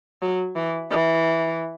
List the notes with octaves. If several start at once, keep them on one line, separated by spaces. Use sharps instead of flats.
F#3
E3
E3